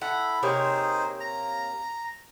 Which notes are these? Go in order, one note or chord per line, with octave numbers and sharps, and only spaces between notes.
E4 A4 F#5 B5
C3 A#3 D#4 G#4 C5 C#5
A#5